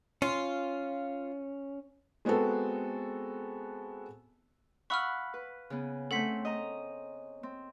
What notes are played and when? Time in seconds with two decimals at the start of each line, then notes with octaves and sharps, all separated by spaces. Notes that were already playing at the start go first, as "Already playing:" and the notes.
0.22 C#4 F4
2.25 G#3 B3 C4 F#4 A4
4.90 F5 F#5 B5 C#6 E6 F6
5.34 B4
5.70 C#3 B3
6.11 A3 C4 C#4 A4 F#5 B6
6.45 D#5 A#5
7.43 C4